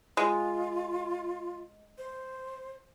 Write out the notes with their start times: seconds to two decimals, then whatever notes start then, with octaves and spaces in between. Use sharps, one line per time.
0.17 G#3 F4
1.98 C5